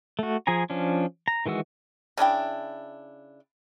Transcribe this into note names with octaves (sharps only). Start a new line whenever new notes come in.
A3 F#4
F3 G#4 G#5 A#5
F3 C#4 D4
A#5
D#3 E3 G#3 F#4 E6
C#3 D4 E4 G5